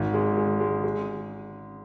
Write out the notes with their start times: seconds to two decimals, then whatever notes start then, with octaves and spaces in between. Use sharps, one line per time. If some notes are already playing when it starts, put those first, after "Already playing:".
Already playing: G#1
0.14 G#3
0.37 G#3
0.60 G#3
0.84 G#3